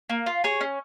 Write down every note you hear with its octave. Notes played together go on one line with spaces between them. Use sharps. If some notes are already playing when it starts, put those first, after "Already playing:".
A#3
F4
G#4 C#5
C#4